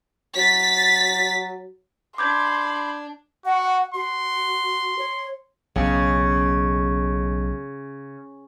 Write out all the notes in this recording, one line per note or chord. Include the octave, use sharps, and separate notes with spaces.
F#3 A6 B6
D4 B5 C6 D6 G6 G#6
F#4 F#5
F#4 C6
C#5
B1 C#3